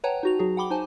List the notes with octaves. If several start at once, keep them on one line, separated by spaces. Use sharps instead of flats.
B4 C#5 F#5 G5 A5 A#5
D#4 F#4 F7
F#3 F#4 G#4
F#5 G5 B5 D6 G7
D#4 C5 G#5 A5